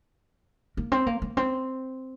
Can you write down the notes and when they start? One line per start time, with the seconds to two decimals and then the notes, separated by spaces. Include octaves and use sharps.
0.77 A#3
0.92 C4
1.07 A#3
1.22 A#3
1.37 C4